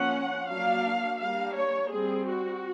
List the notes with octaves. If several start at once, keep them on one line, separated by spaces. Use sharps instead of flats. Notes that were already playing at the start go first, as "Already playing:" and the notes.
Already playing: F3 A#3 C#4 F#5
F#3 A#3 D4 F5
G3 A#3 D4 F5
C#5
G3 C4 G#4
F#4